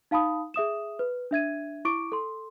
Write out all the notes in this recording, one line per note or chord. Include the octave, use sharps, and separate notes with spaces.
D#4 F5 A5 B5 D#6
G#4 E5 D#6 E7
B4
D4 E5 G#6 D#7
E4 C#6 D6 D7
A4 C6